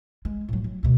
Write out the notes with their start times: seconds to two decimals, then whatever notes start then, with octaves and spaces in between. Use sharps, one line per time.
0.25 G#3
0.49 A2 F#3
0.64 F#3
0.83 D2 B2